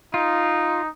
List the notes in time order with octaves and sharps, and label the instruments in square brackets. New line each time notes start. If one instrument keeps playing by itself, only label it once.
[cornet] D#4 [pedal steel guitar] F4